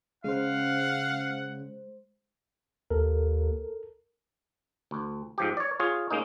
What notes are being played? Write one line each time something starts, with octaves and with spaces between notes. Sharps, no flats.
C#3 G#3 C5 F5 F#5
D#2 A4 A#4
D2
G#2 F3 G4
C#5 D5
F4 G#4 C#5
G#3 A#3 C#4 D#4